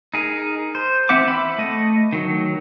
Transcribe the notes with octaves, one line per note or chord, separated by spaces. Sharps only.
D#4 G#4 A#4
C5
E3 C4 E5 F#5 D6
E5 B5
A3 D#5
D#3 F#3